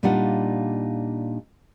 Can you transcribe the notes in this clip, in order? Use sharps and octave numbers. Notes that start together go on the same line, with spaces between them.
A#2 G3 D4 D#4 F5 F#5